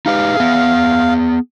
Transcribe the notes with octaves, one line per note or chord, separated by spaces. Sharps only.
D#4 G4 B4 F5
B3 G#4